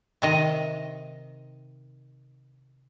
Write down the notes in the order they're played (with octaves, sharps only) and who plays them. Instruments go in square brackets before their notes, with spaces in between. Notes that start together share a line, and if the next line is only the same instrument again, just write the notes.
[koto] C3 D#3 D#5